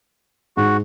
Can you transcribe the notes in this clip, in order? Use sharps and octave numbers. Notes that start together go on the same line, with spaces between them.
G#2 F#4